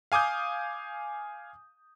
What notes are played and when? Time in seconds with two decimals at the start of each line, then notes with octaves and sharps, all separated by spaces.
0.12 F5 G#5 D6 D#6 G6